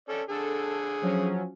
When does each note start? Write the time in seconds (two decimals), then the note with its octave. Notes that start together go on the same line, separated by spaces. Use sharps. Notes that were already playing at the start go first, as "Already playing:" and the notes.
0.09 C#4 A4 D5
0.29 D3 G#4 A4
1.02 F3 F#3 C#4